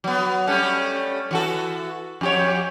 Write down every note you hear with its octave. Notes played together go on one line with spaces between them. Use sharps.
F#3 B3
G3 A3 C#4
E3 F#4 A4
F2 G4 C#5